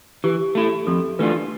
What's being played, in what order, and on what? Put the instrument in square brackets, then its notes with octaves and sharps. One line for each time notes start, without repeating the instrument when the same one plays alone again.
[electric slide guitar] E3 [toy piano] G4
[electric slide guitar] A3 E4
[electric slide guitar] F2 [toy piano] A4
[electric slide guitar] E3 A3 D4 F4 [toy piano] B4